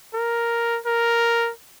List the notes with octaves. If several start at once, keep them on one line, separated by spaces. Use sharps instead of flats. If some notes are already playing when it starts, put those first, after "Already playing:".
A#4
A#4